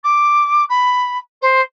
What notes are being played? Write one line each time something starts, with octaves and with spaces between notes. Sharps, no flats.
D6
B5
C5